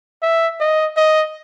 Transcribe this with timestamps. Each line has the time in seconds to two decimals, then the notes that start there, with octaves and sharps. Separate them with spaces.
0.23 E5
0.60 D#5
0.97 D#5